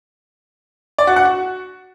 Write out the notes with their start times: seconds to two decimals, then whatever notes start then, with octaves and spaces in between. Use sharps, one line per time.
0.98 D5
1.07 F#4
1.16 F#5
1.25 F#4